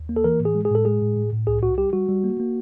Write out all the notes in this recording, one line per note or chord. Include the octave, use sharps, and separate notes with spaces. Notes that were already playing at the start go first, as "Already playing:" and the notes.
Already playing: D#2
A#3
A4
E3 A#4
A2
G#4
G#3
G#4
A2 A4
G#3 G#4
A2
A2
A2
C2 G#4
C2 F#4
G3 G4
G3 F#4
G3
A#3
A#3